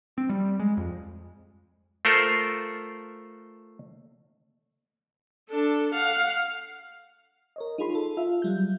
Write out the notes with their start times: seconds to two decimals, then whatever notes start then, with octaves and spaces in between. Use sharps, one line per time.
0.18 C4
0.29 G3
0.60 G#3
0.77 F2
2.05 A3 F4 A4 A#4 C5
5.49 D4 A4
5.94 F5 F#5
7.56 A#4 C#5 D#5
7.78 D#4 F4 G#4 B5 C6
7.95 A4
8.17 F4 E5 F5
8.42 F#3 G3 G6